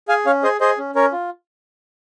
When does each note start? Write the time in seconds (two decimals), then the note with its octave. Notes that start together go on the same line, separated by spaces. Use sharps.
0.08 G#4 F5 G#5
0.26 C#4 C#5 F5
0.43 G#4 C5 D#5
0.60 G#4 C5 D#5
0.78 C#4
0.95 C#4 A#4 C#5
1.12 F4